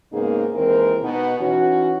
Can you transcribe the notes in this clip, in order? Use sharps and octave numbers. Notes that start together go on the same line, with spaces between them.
G#2 C#3 A#3 B3 D#4 G#4
D#2 E3 G#3 C4 A#4
B2 B3 D#4
E3 C#4 D#4 F#4